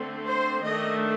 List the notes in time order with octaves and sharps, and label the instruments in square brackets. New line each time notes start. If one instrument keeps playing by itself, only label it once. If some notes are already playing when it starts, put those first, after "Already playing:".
Already playing: [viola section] D3 A3 C4
C5
D#3 A3 D4 D#5